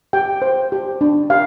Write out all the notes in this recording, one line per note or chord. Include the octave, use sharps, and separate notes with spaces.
G4 G5
C5
G4
D4
G4 F5